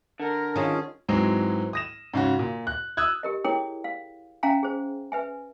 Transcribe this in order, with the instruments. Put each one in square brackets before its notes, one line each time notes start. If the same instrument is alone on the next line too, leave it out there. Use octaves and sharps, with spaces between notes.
[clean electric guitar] D3 [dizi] A#4
[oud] D#3 F4 [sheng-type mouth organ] C#4 G#4
[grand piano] G#2 E3 F#3 G#3 C4
D#6 A#6 E7
G#2 C#3 C#4 F#4
A#2
F#6
D#6 E6 F#6 G#6
[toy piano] G4 A#4 D#5
E4 G#4 A#4 C#5 G5 D#6
F5
C#4 E5 F5 G5 G#5 A#5
G#4 C5
B4 E5 G#5